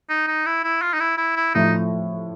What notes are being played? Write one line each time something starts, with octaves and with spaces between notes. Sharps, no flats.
D#4
D#4
E4
E4
F4
D#4
E4
E4
E4
A2 F3 A3 D#4